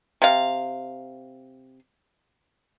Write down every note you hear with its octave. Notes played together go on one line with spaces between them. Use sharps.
C3 F5